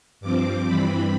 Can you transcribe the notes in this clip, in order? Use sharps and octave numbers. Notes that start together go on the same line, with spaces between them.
G2 F3 C4 D6
G2 E3 G3 C4 B5